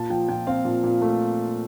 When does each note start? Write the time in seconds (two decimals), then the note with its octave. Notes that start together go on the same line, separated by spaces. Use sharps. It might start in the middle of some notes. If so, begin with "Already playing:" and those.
Already playing: A#2 A5
0.10 F3 G5
0.28 A#2 G5
0.47 C4 F5
0.65 A#2
0.84 A#2
1.02 A3